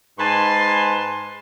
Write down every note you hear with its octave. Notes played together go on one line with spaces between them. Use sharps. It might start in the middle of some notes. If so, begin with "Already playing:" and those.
G#2 B4 G#5 A5 C6